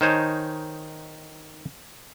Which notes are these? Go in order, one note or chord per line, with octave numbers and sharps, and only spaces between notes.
D#3 D#4 C5 C#5 G#5 A5